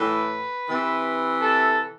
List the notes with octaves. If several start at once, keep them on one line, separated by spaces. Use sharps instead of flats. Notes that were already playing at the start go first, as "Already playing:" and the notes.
Already playing: A2 E3 B4
C3 E3
A4